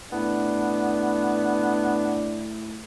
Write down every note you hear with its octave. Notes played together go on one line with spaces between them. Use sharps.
A2 B3 D4